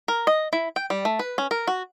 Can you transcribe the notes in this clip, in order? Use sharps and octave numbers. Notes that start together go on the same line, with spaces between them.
A#4
D#5
E4
G5
G3
A3
B4
C#4
A#4
F#4